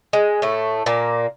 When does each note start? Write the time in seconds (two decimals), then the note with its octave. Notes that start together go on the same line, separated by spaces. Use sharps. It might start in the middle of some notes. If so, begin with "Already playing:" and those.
0.13 G#3
0.42 A2 A3
0.86 A#2 A#3